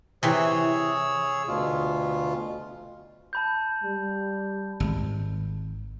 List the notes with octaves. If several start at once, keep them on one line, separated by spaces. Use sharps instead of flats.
C3 E3 G#4 C#5 E6
D2 B2 F4
A5 B5 G6
G3
G#1